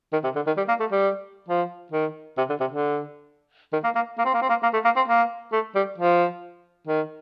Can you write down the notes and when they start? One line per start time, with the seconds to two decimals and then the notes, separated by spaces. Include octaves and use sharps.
0.13 D#3
0.24 C3
0.36 D3
0.47 D#3
0.57 G3
0.69 A#3
0.80 A3
0.92 G3
1.49 F3
1.92 D#3
2.38 C3
2.50 D3
2.60 C3
2.71 D3
3.73 D#3
3.84 A#3
3.96 A#3
4.18 A#3
4.25 C4
4.34 A#3
4.42 C4
4.49 A#3
4.63 A#3
4.74 A3
4.85 A#3
4.96 C4
5.08 A#3
5.53 A3
5.75 G3
5.98 F3
6.87 D#3